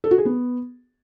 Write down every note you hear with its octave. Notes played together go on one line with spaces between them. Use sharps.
A4
F#4
G#4
B3